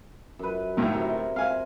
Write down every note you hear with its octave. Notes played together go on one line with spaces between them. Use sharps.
F#2 B4
D2 A2 D#3
C3 A#4
C3 F5 G#5